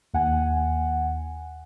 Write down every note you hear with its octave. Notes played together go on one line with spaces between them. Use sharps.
D#2 F#5 G#5